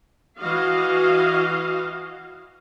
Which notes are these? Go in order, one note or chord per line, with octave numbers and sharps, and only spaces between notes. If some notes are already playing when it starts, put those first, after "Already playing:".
E3 F#4 D#5 F5